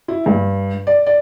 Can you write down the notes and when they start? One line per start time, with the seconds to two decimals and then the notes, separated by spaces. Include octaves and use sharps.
0.08 E4
0.26 G2
0.87 D5
1.06 D5